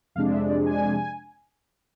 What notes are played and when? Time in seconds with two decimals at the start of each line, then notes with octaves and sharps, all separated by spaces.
0.15 F2 C3 G#3 D4 F5
0.33 E5
0.50 D5
0.66 G#5